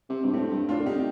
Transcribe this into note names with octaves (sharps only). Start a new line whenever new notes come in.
C3
G2
A2 A3 C4
G2
A2 D4 F4
D3
C3 D#4 G4